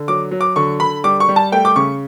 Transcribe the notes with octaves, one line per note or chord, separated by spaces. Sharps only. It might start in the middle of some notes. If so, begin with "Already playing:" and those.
Already playing: D3
F#3 D6
F#3
D6
D3 C#6
D3 B5
G3 D6
C#6
G3
A5
A3 G5
D6
C#3 C#6